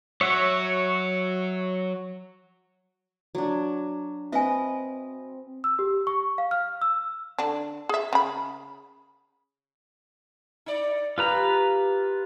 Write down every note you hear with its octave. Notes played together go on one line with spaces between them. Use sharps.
F#3 C#5 E5 F#5
F#3 D4
C4 B4 D#5 E5 G#5
E6
G4
C#6
F5
F6
E6
D3 D4
G#4 E5
C#3 B5
D#4 D5
F4 G4 B4 A#5